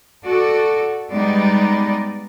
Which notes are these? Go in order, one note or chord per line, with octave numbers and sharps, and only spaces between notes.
F#4 A4 D5
G3 G#3 B3 D#4 D5